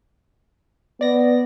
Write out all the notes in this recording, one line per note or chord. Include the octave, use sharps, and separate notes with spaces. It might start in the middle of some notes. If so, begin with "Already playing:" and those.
B3 D5 A#6